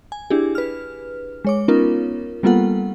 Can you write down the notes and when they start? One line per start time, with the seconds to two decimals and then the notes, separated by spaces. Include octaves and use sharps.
0.12 G#5
0.30 D4 E4 G4 G#4
0.55 B4 F6
1.45 G#3 C#5 D6
1.68 B3 C#4 D#4 F4 A#4
2.43 G3 A#3 B3 F4 A4 F#5